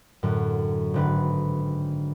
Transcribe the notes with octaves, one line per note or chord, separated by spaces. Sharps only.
F#2 A2 D3
G#1 D3 B4